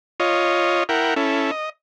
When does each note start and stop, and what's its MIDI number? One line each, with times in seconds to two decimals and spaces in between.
0.20 0.84 65
0.20 0.84 73
0.20 0.84 75
0.89 1.14 64
0.89 1.14 70
0.89 1.14 78
0.89 1.14 79
1.16 1.51 61
1.16 1.51 64
1.16 1.51 69
1.51 1.69 75